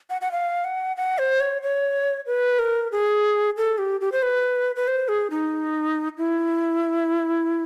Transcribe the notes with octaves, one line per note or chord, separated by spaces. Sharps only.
F#5
F#5
F5
F#5
F#5
C5
C#5
C#5
B4
A#4
G#4
A4
G4
G4
C5
B4
B4
C5
G#4
D#4
E4